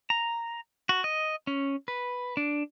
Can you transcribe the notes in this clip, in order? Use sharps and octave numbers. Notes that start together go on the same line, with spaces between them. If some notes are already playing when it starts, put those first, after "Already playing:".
A#5
F#4
D#5
C#4
B4
D4